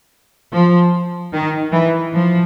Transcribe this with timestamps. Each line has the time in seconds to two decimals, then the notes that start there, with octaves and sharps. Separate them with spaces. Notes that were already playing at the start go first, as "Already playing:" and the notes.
0.52 F3
1.33 D#3
1.72 E3
2.13 F3